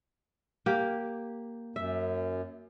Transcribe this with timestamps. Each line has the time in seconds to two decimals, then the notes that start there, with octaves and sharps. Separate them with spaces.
0.66 A#3 G4
1.76 F#2 E5